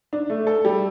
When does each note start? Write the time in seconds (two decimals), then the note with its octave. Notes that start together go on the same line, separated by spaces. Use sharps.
0.13 D4
0.30 A3
0.47 A4
0.65 G3